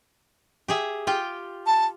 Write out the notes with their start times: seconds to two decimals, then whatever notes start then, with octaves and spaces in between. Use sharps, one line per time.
0.68 G4 G#4 E5
1.07 F4 G4 G5
1.67 A5